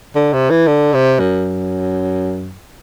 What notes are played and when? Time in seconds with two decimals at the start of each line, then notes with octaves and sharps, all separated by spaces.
0.16 D3
0.33 C3
0.50 E3
0.67 D3
0.94 C3
1.19 F#2